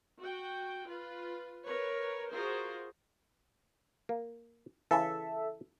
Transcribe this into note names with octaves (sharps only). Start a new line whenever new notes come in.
F#4 G5
F4 B4
A#4 B4 C#5
F4 F#4 G#4 A#4 C5
A#3
C#3 E3 A4 E5